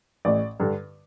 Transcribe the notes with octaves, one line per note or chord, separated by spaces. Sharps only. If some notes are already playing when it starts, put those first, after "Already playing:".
A1 D5
G2 D3